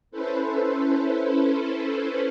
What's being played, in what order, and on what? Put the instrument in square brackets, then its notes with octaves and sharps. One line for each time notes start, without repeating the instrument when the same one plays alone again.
[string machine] C#4 E4 A4 B4 C5